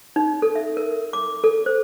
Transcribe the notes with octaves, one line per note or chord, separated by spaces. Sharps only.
D#4
A4
E5
A#4
D6
A4
C5